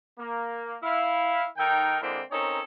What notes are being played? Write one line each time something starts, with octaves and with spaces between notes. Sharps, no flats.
A#3
E4 F5
D#3 D#4 A4 A#4 G5
D3 G#3 A#3 C4 E4
C4 C#4 D#4 A4 A#4 C#5